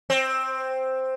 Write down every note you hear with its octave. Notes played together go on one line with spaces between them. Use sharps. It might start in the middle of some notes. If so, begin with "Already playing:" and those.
C4